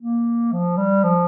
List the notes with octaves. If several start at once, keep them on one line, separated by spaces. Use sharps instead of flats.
A#3
F3
G3
F3